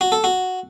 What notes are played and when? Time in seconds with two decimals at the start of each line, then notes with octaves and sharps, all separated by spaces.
0.01 F#4
0.12 A4
0.24 F#4